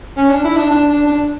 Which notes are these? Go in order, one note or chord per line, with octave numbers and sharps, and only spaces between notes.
C#4
D4
E4
D4
D4
D4
D4